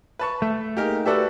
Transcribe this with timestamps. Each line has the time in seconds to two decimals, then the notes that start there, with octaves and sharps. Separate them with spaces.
0.19 B4 A5 C#6
0.42 A3 E5
0.77 A#3 D#4 G4 G#4 A#4
1.05 F#4 G4 A4 B4 D5 E5